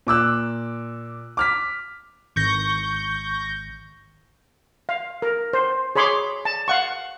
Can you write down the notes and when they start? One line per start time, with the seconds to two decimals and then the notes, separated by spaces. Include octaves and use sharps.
0.07 A#2 D6 E6 F#6
1.37 D6 F6 B6
2.36 G#1 C#6 G6 A#6
4.89 F5
5.22 A#4
5.53 C5
5.95 G#4 C#5 B5 C6 D6
6.45 A5
6.68 F5 F#5 C#6